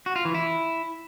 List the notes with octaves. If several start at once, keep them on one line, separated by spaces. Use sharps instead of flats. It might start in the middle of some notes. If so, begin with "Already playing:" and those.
F#4
F4
E3
E4